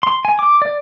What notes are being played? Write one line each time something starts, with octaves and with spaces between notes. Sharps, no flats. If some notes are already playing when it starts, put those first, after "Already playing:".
C6
G#5
D6
D5